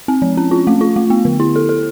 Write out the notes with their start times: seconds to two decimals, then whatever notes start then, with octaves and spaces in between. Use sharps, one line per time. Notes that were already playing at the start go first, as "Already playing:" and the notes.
0.08 C4
0.22 F3
0.37 C#4
0.51 F4
0.67 A3
0.81 F4
0.96 A3
1.10 B3
1.25 D3
1.40 E4
1.56 A4
1.69 A4